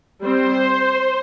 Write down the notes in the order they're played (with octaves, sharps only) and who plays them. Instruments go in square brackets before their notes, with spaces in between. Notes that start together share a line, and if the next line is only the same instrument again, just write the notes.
[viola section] G3 C4 C5